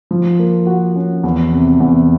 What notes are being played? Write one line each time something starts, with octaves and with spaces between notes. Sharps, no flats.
F3
A#3
F#4
C#4
E2
C3
E2